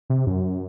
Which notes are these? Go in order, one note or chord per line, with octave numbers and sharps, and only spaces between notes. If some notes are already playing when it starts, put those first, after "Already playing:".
C3
F#2